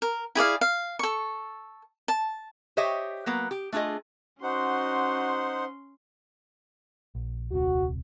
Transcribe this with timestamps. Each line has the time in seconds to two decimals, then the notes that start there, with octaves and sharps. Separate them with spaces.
0.02 A#4
0.35 E4 G#4 D5 F5
0.61 F5
0.99 A4 C#6
2.08 A5
2.77 G4 C5 C#5 D#5 E5 G5
3.26 F#3 A#3 B3
3.51 G4
3.72 A3 D4 F4 G#4 D#5
4.43 C#4 D#4 F#4 C5 F#5 C6
7.15 A#1
7.52 D#1 C2 C3 F#4